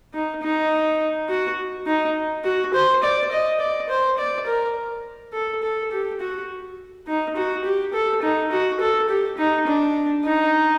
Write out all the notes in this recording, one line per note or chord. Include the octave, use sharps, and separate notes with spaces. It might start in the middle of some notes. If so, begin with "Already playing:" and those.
D#4
D#4
F#4
D#4
F#4
C5
D5
D#5
D5
C5
D5
A#4
A4
A4
G4
F#4
D#4
F#4
G4
A4
D#4
F#4
A4
G4
D#4
D4
D#4